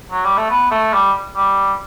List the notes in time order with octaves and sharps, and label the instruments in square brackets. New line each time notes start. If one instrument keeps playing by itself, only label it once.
[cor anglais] F#3
G3
A3
B3
A3
G3
G3